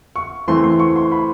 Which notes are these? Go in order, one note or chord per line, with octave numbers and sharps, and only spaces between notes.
C#6
E3 A3 C4 C6
C6
C#6
C6
B5